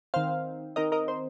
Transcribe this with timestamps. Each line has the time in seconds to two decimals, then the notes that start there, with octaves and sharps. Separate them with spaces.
0.14 D#3 C4 C5 F5
0.76 D#3 C4 A#4 D#5
0.92 A#4 D#5
1.08 C5